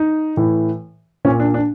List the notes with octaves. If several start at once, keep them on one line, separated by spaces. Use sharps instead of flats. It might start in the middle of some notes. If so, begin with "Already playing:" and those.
Already playing: D#4
A2 E3
A#2 C#4
D4
D4